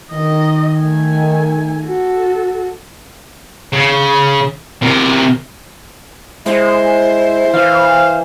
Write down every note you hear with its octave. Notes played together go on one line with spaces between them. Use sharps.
D#3 D#5
A3 G#5
F#4 A4
C#3
C3 A#4
G#3 E4 C5
E3 F5